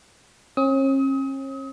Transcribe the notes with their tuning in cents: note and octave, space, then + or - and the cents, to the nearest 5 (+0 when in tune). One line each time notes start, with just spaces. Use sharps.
C#4 -40 D#6 +35